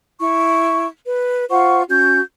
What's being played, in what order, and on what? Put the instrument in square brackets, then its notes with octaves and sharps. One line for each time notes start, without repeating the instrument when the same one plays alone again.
[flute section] E4 C#6
B4
F4 C5 F#5 C#6
C#4 F#4 G6